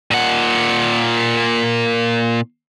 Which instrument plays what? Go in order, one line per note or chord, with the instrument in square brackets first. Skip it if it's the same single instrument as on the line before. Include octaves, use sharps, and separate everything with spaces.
[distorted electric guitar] A#2 F#5